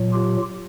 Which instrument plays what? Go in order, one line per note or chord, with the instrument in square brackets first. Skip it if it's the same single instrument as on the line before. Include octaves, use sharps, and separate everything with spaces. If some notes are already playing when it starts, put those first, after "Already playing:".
Already playing: [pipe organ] A#2 F#3
F4 G4